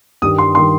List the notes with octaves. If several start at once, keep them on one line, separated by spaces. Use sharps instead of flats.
G2 D#3 G3 D#6
C6
D#3 G3 C6